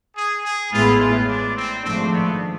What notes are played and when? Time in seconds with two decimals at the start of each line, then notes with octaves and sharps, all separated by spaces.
0.16 G#4
0.45 G#4
0.72 A1 A2 G#3 B3 E4 F4
1.00 F4
1.29 D4
1.57 C4
1.85 G#1 G#2 F3 A3 C4 D4
2.13 B3